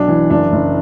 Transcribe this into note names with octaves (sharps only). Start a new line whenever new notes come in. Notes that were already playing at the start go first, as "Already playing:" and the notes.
Already playing: B1 D4
E3
F#1 D4
F#1